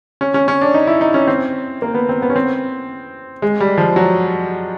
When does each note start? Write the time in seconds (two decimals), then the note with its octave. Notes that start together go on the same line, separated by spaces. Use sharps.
0.21 C#4
0.34 C#4
0.48 C#4
0.61 D4
0.74 D#4
0.87 E4
1.01 D#4
1.14 C#4
1.28 C4
1.82 A#3
1.95 B3
2.09 C4
2.22 B3
2.30 C#4
2.36 C4
3.42 G#3
3.60 G3
3.78 F3
3.96 F#3